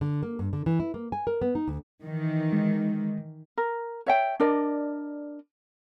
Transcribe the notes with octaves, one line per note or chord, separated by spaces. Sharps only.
D3
A#3
G2
D3
E3
E4
A#3
G#5
A#4
B3
D#4
D2
D#3 E3
G#3
A#4
C#5 E5 G5
D4 A#4 D5 D#5